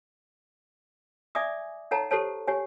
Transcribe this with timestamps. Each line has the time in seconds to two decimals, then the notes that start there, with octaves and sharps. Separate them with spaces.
1.35 D5 E5 G#5 D6 D#6
1.91 D#4 A4 C#5 F#5 A5 A#5
2.11 G4 A4 C5 C#5 A5
2.47 G4 C#5 G#5